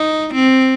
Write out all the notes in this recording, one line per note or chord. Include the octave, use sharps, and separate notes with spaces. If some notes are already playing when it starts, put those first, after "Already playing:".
Already playing: D#4
C4